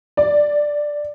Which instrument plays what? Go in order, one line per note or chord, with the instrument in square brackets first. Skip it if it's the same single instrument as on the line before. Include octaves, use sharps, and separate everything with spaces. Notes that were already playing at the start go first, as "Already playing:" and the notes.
[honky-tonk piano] D5